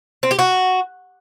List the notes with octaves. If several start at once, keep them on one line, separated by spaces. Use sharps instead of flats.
C4
G4
F#4